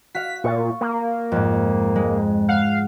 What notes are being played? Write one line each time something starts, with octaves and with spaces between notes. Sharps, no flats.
F#4 F5 B6
A#2 C#6 A6
A#3
F2 G#2
G#3
F5 F#5